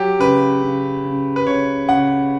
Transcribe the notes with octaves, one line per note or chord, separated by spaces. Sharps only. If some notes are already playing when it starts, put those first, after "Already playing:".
Already playing: F#3 G4
C#3 B4
C#3
C#3
B4
C#3 C#5
C#3 F#5